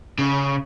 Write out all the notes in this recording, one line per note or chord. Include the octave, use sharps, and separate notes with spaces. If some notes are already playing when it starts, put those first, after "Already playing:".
C#3